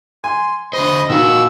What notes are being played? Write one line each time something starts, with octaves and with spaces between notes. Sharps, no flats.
G#5 C6
D3 C5 D#5 B5
A#2 D#3 F#4 F5 E6